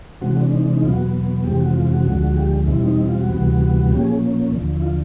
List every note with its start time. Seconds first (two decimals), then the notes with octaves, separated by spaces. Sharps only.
0.21 C3 E3 G#3 C4 F#4
0.37 D4
0.52 D#4
0.63 D4
0.73 D#4
0.83 E2 B2 F#3 B3 F4
0.94 F#4
1.44 F2 C3 E3 G#3 C4 G4
1.60 F#4
1.74 F4
1.88 F#4
2.06 D2 D3 F3 G#3
2.37 G4
2.68 E2 B2 G3 C4 E4
2.83 D#4
2.98 E4
3.09 F4
3.19 F#4
3.30 D2 C3 E3 G3 B3
3.90 A#2 F3 A#3 C#4 G4
4.01 G#4
4.52 D#2 D3 F3
4.77 E4
4.83 F4